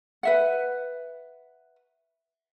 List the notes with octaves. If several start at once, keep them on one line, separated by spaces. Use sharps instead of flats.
B4 E5 F#5